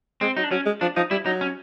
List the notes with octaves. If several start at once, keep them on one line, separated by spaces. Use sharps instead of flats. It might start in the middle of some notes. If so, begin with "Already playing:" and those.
G#3 C4
F#3 D#4
D4
F#3 C#4
G#3
F3 D4
F3 D#4
G3 E4
F#3 D#4
C#4